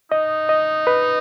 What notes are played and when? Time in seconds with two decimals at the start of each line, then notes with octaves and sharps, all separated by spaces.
0.11 D#4 D#5
0.49 D#5
0.87 B4